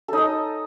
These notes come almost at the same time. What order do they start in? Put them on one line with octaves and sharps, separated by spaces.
A4 D#4 D#5